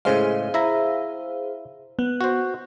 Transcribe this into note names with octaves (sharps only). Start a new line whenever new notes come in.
A2 C#3 G#3 G#4 C5 F5
E4 E5 A#5
B3
F#4 C5